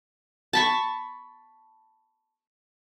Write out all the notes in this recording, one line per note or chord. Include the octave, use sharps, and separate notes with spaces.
A5 B5 C#6